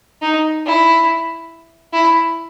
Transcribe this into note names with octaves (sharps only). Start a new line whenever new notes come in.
D#4
E4
E4